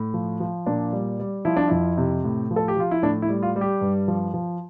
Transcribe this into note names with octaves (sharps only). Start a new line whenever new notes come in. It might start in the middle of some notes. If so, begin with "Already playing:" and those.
Already playing: A2
F3
F3
A#2 D4
G3
G3
F3 E4
D4
F2 E4
C3
A2
F3
A4
G4
F3 F4
E4
A2 D4
E4
G3
F4
G3
G4
G2
F3
F3